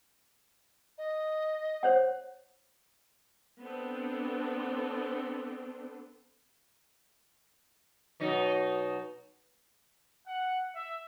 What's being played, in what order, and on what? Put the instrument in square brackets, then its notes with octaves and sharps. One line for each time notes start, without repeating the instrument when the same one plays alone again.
[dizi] D#5
[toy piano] C5 C#5 F#5
[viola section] B3 C4 D4 A4
[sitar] B2 F#3 D#4
[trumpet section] F#5
E5